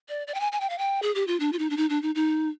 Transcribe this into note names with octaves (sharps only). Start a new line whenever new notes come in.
D5
D5
G5
G#5
G#5
G5
F5
G5
G#4
G4
F4
D4
F4
D#4
D4
D#4
D4
D#4
D#4